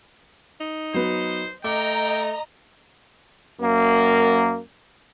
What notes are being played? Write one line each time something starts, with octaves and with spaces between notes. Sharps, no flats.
D#4
F#3 B3 C5
A3 D#5 G5 A#5 D6
F#2 A#3